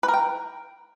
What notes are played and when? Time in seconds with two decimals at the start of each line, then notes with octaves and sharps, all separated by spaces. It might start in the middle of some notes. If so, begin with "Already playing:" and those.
0.03 B4
0.08 A#4
0.14 G5